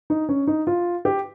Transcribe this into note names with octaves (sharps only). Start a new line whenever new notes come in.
D#4
C#4
D#4
F4
G4